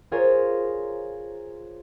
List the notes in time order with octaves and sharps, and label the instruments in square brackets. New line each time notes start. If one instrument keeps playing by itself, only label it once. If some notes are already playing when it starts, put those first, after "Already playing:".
[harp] F4 G#4 A#4 C5 C#5